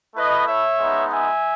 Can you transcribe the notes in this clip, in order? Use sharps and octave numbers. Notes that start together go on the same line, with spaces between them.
A3 E4 B4 D#5
C#5 E5
G#3 B3 D#4
E5 G#5